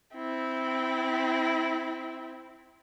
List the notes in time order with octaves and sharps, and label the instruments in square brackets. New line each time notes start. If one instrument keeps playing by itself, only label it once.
[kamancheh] C4 E4